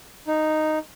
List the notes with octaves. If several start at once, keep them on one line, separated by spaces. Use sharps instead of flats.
D#4